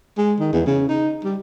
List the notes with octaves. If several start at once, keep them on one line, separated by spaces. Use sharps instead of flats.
G#3
D#3
E2
C#3
D#4
G3